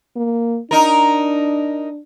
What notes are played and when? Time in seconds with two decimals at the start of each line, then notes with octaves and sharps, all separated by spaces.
0.16 A#3
0.71 D4 D#4 A#4